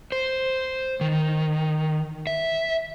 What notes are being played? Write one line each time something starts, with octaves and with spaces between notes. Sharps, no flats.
C5
D#3
E5